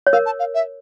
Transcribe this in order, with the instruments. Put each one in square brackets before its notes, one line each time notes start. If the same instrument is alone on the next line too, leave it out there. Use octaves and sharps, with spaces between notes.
[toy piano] C#5
[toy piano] A#4 [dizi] F5
[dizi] A5
F5
E5